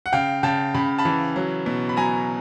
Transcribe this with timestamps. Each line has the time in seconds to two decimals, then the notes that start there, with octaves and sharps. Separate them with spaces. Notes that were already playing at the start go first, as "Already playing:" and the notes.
0.06 F#5
0.12 C#3 F5 G5
0.43 C#3 G5 A5
0.74 C#3 B5
0.98 A5 B5
1.05 E3
1.36 F#3
1.66 B2
1.89 B5
1.97 F#3 G#5 A#5